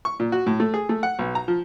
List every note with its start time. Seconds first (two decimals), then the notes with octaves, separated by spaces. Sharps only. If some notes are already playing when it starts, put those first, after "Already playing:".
0.05 C#6
0.20 A#2
0.32 F#4
0.46 A2
0.60 A3
0.74 G#4
0.89 A3
1.03 F#5
1.19 B1
1.35 A#5
1.48 F3